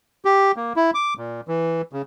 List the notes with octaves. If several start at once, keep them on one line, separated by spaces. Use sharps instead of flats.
G4
A#3
E4
D6
A#2
E3
C#3